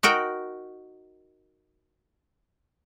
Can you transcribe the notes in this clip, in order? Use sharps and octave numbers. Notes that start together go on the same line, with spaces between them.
D#4 F#4 A#4 G5